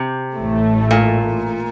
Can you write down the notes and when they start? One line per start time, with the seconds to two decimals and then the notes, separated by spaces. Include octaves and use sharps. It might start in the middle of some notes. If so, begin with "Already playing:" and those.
Already playing: C3
0.35 A1 A2 A3
0.91 A#2